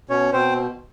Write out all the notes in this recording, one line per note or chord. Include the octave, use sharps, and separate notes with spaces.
B2 C#4 C#5
B2 C4 C5